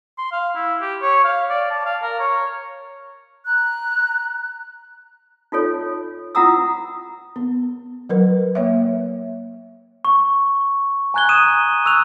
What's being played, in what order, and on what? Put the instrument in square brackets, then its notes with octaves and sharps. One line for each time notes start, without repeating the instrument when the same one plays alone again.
[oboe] C6
F5
E4
G4
C#5
F5
D5
A5
F5
A#4
C#5
[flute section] A#5 F#6
[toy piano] D#4 F4 A4 C#5
E4 F4 F#5 A#5 D#6 E6
[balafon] B3
F#3 A#4 B4
A#3 C#5 E5
[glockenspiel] C#6
G#5 A#5 F#6 G#6 G7
D#6 D#7 E7
C#6 E6 F#6 F7